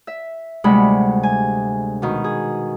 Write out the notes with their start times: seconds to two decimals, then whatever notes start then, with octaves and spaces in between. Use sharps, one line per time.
0.07 E5
0.64 D2 C3 G3 G#3 F#5 B5
1.23 G#5
2.02 B2 D#3
2.24 G#4